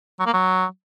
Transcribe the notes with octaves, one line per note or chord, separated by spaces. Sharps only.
F#3
A#3
F#3